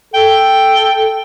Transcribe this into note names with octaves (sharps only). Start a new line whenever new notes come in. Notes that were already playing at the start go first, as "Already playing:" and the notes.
A4 G5